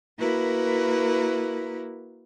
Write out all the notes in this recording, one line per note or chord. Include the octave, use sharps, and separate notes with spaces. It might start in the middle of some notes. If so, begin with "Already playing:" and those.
A#3 E4 F#4 A#4 B4